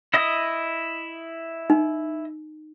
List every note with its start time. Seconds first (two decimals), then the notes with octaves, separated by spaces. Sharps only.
0.14 E4 D#5 D#6
1.70 D#4